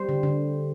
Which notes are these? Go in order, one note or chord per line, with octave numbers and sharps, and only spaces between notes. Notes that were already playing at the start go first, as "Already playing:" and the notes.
Already playing: G3 C5
D3
D3